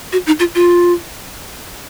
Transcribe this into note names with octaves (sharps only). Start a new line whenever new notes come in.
F#4
D#4
F4
F4